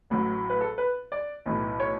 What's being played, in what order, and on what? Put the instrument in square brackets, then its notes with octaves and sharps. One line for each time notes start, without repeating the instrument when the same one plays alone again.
[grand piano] A1 A2 F#3
B4
A4
B4
D5
B1 A2 E3
C#5